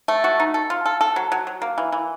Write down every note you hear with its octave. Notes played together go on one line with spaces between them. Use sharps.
A3
F#4
D#4
A4
F4
A4
A4
F#3
F#3
F#3
A#3
E3
E3